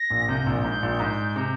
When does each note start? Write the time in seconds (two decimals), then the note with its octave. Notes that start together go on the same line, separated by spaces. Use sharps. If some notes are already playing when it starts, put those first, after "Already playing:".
Already playing: A#6
0.10 A#1 A#2
0.28 C2 C3 G6
0.46 A#1 A#2
0.64 G#2
0.82 A#1 A#2
1.00 G#2
1.36 C3